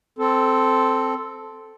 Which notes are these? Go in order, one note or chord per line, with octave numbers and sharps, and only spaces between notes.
C4 A4